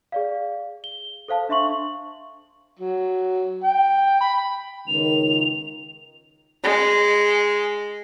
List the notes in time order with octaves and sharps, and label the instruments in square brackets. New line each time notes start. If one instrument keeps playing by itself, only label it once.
[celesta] G#4 D5 F5
G7
A4 C5 F5 A5
D4 E5 C6 C#6 F#7
[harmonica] F#3
G5
B5
[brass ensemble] C#2 D#3 [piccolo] F7
[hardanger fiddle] G#3